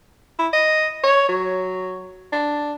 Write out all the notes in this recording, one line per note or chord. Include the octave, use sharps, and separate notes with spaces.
E4
D#5
C#5
F#3
D4